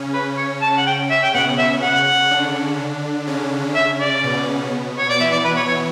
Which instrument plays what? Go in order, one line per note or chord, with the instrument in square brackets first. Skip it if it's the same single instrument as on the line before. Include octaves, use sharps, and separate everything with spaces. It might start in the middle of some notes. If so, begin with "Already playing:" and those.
Already playing: [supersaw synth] C#3 C#4
[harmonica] B4
C#5
A5
F#5
G5
E5
G5
[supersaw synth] B2 B3 [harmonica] F#5
[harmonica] E5
[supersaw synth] C#3 C#4 [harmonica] F#5
[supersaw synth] D3 D4
C#3 C#4
[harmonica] E5
D5
[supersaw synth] B2 B3
[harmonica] C#5
D5
[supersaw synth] E3 E4 [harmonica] E5
[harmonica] D5
B4
C#5
C#5